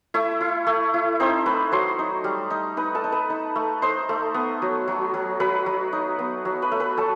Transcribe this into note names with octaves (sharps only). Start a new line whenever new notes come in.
A3 E4 E5
E4
A3
E4
C4 D#4 C5
A3 B4 B5
F#3 C5 C6
D#4
G3
D#4
D#4 B4 B5
A4 A5
D#4
B4 B5
D#4
A3
D#4 C5 C6
A3
B3
F#3
F#3
F#3
F#3 B4 B5
F#3
D#4
B3
F#3
B4 B5
A3
B4 B5
F#3 A4 A5